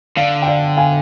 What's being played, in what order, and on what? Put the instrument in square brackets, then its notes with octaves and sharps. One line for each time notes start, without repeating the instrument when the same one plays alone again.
[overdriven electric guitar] D3 [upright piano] D5 F5
[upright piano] G5
D5 F5
F5 G#5